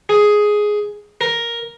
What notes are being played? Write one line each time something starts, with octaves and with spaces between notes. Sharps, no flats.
G#4
A#4